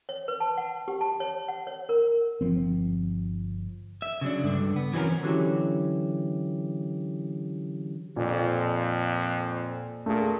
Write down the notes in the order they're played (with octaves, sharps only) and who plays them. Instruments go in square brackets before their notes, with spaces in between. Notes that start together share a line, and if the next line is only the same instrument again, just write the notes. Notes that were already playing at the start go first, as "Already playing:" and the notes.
[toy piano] C#5
B4
A5
F#5
G4
A5
C#5
F#5
C#5
A#4
[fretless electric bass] G1 F3 C4
[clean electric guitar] E5
C#3 F#3 D4
C#2 G2 D3
B3
E3 F#3 C4 C#4 A#4
[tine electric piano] D3 E3 F#3 C#4 E4 G4
[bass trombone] F2 [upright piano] A#2
[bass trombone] A#2 [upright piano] A3 G#4